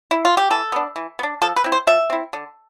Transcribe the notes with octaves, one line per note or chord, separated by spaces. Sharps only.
E4
F4
G4
E3 A4
B3 D4
E3
B3
D4
F3 A4
B4
C4 E4
C5
F3 E5
C4 E4
D3